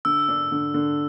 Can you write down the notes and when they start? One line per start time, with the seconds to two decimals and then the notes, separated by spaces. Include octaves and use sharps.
0.05 D3 E6
0.29 D4
0.52 D3
0.74 D3